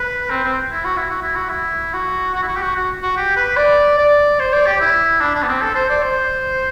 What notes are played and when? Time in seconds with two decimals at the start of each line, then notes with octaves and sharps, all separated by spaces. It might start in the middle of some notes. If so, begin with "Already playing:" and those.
Already playing: B4
0.30 C4
0.44 C4
0.71 E4
0.84 F#4
0.97 E4
1.10 F#4
1.22 E4
1.35 F#4
1.49 E4
1.94 F#4
2.35 F#4
2.42 E4
2.48 F#4
2.56 G4
2.62 F#4
2.76 F#4
3.03 F#4
3.17 G4
3.37 B4
3.57 D5
3.98 D5
4.40 C5
4.53 D5
4.66 G4
4.81 E4
5.21 D4
5.34 D4
5.43 B3
5.48 C4
5.62 A4
5.75 C5
5.90 D5
6.02 C5